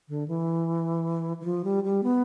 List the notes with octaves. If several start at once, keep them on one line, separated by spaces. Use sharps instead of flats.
D3
E3
E3
F3
G3
G3
B3